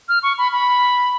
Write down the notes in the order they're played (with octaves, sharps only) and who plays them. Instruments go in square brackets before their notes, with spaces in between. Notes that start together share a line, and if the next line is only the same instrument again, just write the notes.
[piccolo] F6
C#6
B5
B5